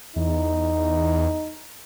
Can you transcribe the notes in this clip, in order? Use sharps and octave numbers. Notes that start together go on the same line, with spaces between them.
E2 D#4